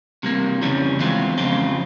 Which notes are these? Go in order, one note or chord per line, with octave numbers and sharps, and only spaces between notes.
C3 G3 A#3
F2 C#3 E3 G3 C#4
E2 E3 G#3 C4 F4
F2 C#3 F3 C4 F4